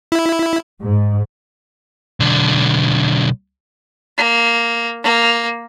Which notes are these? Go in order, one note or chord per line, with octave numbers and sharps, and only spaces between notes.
E4
G#2
B1 D3
A#3
A#3